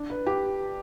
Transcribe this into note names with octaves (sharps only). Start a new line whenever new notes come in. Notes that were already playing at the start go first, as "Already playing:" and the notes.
Already playing: D4
B4
G4